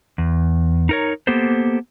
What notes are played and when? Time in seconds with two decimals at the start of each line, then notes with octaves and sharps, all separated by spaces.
0.18 E2
0.89 D#4 A#4 C#5
1.27 A#3 B3 G4 A4 C5